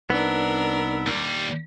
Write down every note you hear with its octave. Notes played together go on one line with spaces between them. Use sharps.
C2 B3 D4 D#4 A#4 E6
D#2 G3